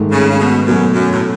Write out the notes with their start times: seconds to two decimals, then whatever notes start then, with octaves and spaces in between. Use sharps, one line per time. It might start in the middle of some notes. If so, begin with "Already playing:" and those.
Already playing: G#2 D#3 A3
0.12 C#3
0.30 C#3
0.39 B2
0.66 F#2 B2 F#3 A3
0.94 F#2
1.12 A2